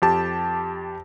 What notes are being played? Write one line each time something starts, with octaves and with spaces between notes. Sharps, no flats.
F2 G4 A5